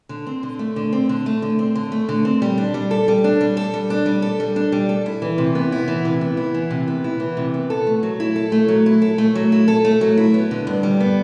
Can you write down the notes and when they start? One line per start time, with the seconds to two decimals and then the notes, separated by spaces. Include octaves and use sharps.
0.09 D3
0.27 C4
0.43 D3
0.59 A3
0.76 D3
0.93 C4
1.09 D3
1.26 A3
1.42 D3
1.59 C4
1.75 D3
1.92 A3
2.09 D3
2.25 C4
2.42 G3
2.58 D4
2.74 G3
2.91 A4
3.08 G3
3.24 D4
3.41 G3
3.57 A4
3.74 G3
3.90 D4
4.06 G3
4.22 A4
4.40 G3
4.56 D4
4.72 G3
4.89 A4
5.06 E4
5.22 E3
5.38 C3
5.55 B3
5.72 E4
5.88 E3
6.05 C3
6.21 B3
6.37 E4
6.54 E3
6.71 C3
6.88 B3
7.04 E4
7.20 E3
7.37 C3
7.54 B3
7.70 A4
7.87 A3
8.03 F#3
8.20 E4
8.36 A4
8.52 A3
8.68 F#3
8.86 E4
9.02 A4
9.18 A3
9.35 F#3
9.52 E4
9.68 A4
9.85 A3
10.01 F#3
10.17 E4
10.34 B3
10.51 D3
10.67 G2
10.83 G3
11.00 B3